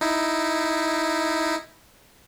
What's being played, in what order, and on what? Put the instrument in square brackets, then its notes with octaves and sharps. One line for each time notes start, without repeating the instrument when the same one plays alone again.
[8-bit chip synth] D#4 E4